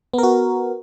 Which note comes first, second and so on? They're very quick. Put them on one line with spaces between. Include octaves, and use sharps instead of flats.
B3 A#4 F#4